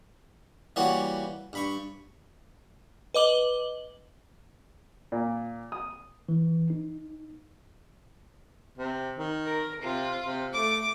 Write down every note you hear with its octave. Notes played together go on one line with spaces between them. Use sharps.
E3 G3 A#3 F#4 C#5 F#5
G2 B5 C#6
B4 D#5 D6 F#7 G7
A#2
D#6
E3
D#4
C3
D#3
A#4
C3 F4
C3
A3 D6